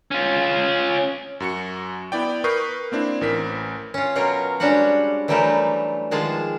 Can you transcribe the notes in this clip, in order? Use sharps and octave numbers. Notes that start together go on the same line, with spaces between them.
C#4 F4
F#2 F#4 C#7
B3 E4 D5 G5
A#4 B4 C#6 D#6 G6 C7
A#3 C4 D4 E4
A1 E3 A#4 C5 B6
C#4 F4
B2 F#3 F4 A#4
G3 G#3 C#4 D4 F#4 F#5
E3 F#3 G3 A3 G4 A#4
D#3 F3 G#3 F4 G#4 A5